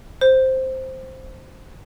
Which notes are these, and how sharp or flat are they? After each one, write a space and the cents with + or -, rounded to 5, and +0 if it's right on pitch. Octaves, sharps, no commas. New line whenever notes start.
C5 +0